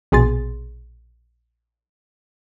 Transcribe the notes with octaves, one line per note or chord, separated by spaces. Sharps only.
A#1 B2 G#4 C6 A6